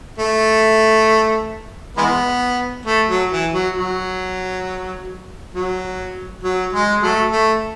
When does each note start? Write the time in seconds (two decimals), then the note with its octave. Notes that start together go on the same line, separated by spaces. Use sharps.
0.18 A3
1.97 E3 G#3 B3
2.86 A3
3.09 F#3
3.31 E3
3.53 F#3
3.76 F#3
5.54 F#3
6.43 F#3
6.73 G#3
7.02 F#3 A3
7.32 A3